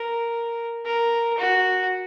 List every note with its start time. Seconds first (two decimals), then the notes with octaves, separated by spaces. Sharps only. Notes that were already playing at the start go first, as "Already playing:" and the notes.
Already playing: A#4
0.86 A#4
1.38 F#4